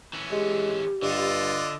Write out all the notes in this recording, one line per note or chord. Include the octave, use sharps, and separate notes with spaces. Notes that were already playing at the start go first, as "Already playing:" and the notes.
E3 C#4
G#3 G4
G2 D3 F4 D5 D#5